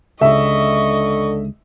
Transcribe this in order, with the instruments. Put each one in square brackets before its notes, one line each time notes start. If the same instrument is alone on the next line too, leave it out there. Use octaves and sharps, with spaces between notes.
[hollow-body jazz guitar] C#2 [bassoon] D3 [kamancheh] D#5 C#6 [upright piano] E5